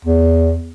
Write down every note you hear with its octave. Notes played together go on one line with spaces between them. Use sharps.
E2